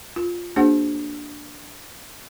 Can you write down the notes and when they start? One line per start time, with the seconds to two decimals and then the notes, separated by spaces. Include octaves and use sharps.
0.16 F4
0.56 A#3 D4 F#4 G#4 C5 F#5